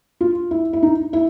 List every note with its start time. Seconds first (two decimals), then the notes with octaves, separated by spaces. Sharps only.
0.21 F4
0.51 E4
0.73 E4
0.83 D#4
1.13 E4